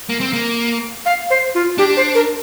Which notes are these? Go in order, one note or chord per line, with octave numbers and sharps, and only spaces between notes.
A#3
C4
A#3
F5
C5
F4
D4 G4
C5
A#4